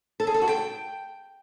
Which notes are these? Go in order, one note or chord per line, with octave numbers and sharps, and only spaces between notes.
A4
G#4
A4
F#4
G5